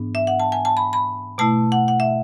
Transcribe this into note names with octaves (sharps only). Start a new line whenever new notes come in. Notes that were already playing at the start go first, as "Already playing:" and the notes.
Already playing: G#2 E3 B3 D4
E5
F#5
A5
G#5
A5
B5
B5
B2 A3 E4 A5
F#5
F#5
E5